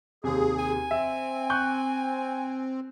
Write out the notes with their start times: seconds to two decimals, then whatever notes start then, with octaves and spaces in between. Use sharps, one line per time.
0.24 D#2 C3 G#4
0.59 G#5
0.91 C4 E5
1.50 C#6 F#6 G6